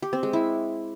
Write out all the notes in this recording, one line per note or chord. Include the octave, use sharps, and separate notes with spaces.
G4
C4
G#3
E4